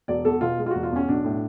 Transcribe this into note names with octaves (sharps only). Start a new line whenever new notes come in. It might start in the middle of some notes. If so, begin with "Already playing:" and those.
E1 D5
E2 A4
B2 F4
G#3
F4
E1 F#4
F4
E2 C#4
B1 D4
A2